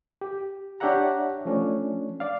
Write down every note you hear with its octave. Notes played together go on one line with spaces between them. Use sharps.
G4
D4 G4 C#5 E5 F#5 A#5
F3 A3 C#4 D4
D5 F5